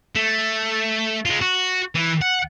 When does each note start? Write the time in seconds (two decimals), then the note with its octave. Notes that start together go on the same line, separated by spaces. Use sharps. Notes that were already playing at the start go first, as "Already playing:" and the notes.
0.15 A3
1.25 G#3 F4
1.41 F#4
1.95 E3
2.21 F#5